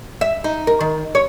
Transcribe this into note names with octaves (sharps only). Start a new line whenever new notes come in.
E5
D#4
A#4
D#3
C#5